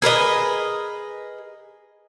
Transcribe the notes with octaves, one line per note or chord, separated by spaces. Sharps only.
G#4 A#4 B4 D#5